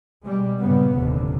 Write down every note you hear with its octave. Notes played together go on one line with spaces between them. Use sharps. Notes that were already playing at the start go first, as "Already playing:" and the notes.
B2 G3 G#3
G2 A#2 C#3 G3 B3
F1 D#2 A#2 D3